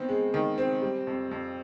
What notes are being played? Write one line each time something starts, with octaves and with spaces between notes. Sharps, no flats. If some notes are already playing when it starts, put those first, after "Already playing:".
Already playing: D#3 B3 C4
G#3
D#3
C4
G3
F2
F2